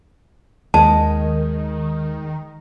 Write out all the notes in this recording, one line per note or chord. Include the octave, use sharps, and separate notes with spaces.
D#2 D#3 G#3 A5